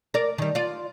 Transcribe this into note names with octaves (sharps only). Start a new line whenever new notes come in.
A#4 D5
D#3 G3
F4 D5